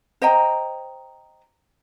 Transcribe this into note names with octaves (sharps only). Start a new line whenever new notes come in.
C5 D#5 G5 A#5